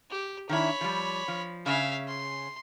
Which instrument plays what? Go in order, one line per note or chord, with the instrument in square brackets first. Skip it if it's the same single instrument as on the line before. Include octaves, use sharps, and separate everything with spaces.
[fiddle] G4
[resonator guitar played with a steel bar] D#3 D4 E4 [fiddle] C#5 B5
[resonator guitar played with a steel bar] F3 G3
F3
[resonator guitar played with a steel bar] C#3 C#4 [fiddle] E5 F5
[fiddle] C6